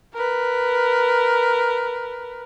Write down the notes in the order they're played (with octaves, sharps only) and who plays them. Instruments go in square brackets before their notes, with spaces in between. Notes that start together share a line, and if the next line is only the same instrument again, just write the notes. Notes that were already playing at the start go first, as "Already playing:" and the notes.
[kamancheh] A#4 B4